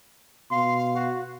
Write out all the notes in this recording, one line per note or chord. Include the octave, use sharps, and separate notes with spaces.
B2 F5 C6
F#4